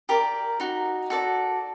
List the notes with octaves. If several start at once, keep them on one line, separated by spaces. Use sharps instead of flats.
G4 A#4 D5
D#4 F#4
F#4 A4 D5